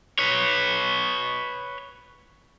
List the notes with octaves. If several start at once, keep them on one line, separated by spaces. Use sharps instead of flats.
B4 C#5